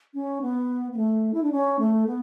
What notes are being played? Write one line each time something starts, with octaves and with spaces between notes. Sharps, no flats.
C#4
B3
B3
A3
E4
D4
C#4
A3
B3